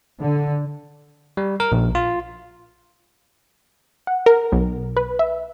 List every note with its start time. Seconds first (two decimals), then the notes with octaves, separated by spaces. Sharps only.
0.20 D3
1.37 G3
1.60 A#4
1.72 A#1
1.95 F4
4.07 F#5
4.26 A#4
4.52 B1
4.97 B4
5.19 E5